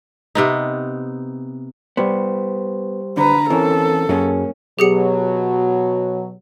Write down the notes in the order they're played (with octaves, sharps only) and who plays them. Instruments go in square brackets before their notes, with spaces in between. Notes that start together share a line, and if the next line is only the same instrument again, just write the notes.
[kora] C3 B3 D#4
[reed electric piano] G3 G4 C5 [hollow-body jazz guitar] B3
[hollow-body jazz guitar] D3 [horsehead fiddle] B4 A#5
[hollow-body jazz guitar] E3 [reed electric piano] C4 C#4 A#4 [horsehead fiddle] A4
[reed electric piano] F#2 G#4 [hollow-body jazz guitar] F#3 A#3 C#4
[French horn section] B2 F#3 [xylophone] G4 G#4 C#7